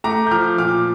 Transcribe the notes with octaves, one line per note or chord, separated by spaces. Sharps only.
A3 A#5 D6
G6
F3 D6 F6
A#2 D6 F6